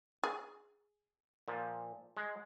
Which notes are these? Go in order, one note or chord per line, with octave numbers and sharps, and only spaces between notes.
G#4
A#2 F3
G#3